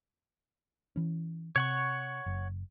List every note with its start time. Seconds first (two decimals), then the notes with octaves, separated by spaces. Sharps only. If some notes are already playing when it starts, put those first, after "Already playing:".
0.96 E3 C#4
1.56 C3 C#5 F#5 C#6
2.26 F#1